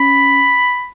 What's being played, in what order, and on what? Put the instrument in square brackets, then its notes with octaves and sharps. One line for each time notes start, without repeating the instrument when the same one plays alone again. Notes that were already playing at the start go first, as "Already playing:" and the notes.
Already playing: [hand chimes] C#4 [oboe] B5